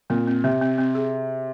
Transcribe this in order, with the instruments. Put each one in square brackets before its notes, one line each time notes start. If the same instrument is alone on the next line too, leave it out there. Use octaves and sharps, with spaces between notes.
[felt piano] A#2 [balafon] C4
[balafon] C4
[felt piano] C3 [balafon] C4
[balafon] C4
C4
G#4